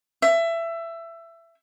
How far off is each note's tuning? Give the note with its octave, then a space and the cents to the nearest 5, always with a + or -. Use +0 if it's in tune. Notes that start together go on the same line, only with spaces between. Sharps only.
E5 +20